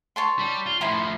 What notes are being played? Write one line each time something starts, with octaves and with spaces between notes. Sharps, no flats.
C#5 A5 C6
G3
F4
A2 F3 E4 A#5 C6